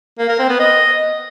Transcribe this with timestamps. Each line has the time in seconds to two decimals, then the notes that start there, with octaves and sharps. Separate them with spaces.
0.18 A#3
0.29 A#4
0.39 C4
0.49 B3
0.60 D#5